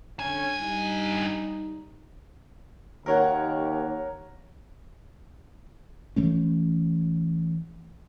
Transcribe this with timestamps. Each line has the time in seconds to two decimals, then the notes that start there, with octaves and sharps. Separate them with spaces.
0.19 G2 D3 C#4 G#5
0.61 G3 D#4
3.06 D#2 A#4 C#5 F#5
6.16 E3 A3 C#4